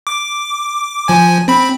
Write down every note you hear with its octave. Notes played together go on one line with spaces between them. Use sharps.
D6
F3 G#5
C4 B5